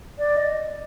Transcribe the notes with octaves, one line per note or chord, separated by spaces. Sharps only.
D5
D#5